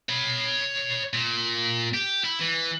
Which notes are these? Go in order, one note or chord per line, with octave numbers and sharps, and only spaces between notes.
C#5 B5
A#2
G4
E4
E3